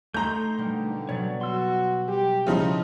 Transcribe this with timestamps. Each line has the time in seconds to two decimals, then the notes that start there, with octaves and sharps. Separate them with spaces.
0.14 A3 D#4 A#5 C6 G6
0.58 B2 D3 G3 A#3
1.09 B2 F#3 C#5 D5
1.41 F#4 C6 E6
2.08 G3 G4
2.47 C#3 F3 D#4 E4